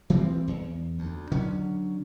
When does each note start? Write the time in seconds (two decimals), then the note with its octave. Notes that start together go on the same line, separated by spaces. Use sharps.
0.10 E3 G3 G#3 C4
0.48 E2
0.99 D2
1.32 D3 F#3 C#4